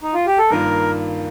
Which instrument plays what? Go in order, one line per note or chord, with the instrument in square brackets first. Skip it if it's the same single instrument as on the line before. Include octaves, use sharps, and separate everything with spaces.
[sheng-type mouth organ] D#4
F4
G4
A4
[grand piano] G2 D#3 A#3 F4 [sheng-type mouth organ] A#4